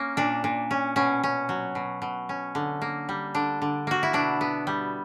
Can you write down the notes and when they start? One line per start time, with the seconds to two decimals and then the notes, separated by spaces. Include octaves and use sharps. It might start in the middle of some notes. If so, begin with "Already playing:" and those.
Already playing: A#3 C#4
0.17 A#2 D4
0.44 A#2
0.71 C#4
0.96 B2 C#4
1.23 C#4
1.49 F#3
1.75 B2
2.02 B2
2.29 C#4
2.55 D3
2.82 A#3
3.09 G3
3.35 D3 D4
3.62 D3
3.87 A#3 F#4
4.03 E4
4.13 B2 D4
4.41 B3
4.67 G3